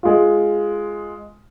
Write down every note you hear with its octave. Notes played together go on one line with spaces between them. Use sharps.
G#3 F4